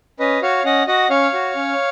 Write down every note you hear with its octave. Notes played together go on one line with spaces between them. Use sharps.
C#4 B4 D#5
F#4 C#5 F5
C#4 D#5 F#5
F#4 D#5 F#5
C#4 C#5 F5
F#4
C#4